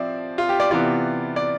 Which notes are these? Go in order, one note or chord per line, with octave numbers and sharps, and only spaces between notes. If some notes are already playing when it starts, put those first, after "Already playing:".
Already playing: F3 C4 D5 E5
F4
G4
D5
C3 E3 B3 F4 D5
D5